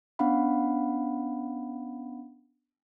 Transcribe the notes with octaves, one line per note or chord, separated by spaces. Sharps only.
B3 C#4 D4 F5 F#5 B5